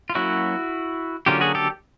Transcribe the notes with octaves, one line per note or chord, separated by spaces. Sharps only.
F4
F#3 A#3 C#4 E4 F#4
D3 F#3 A#3 C#4 F4 G4
F#4 G#4
G4 A4